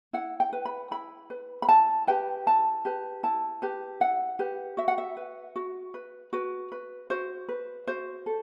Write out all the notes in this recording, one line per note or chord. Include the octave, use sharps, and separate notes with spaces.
E4 F#5
G5
B4
B5
E4 B5
B4
B5
E4 A5
G4 B4 G5
E4 A5
G4 B4
E4 A5
G4 B4
E4 F#5
G4 B4
F#4 E5
F#5
E5
B4
F#4
B4
F#4 B4
B4
F#4 C5
B4
F#4 C5
A4